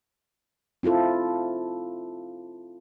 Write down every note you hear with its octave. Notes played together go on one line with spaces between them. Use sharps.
C4 E4 F4 A4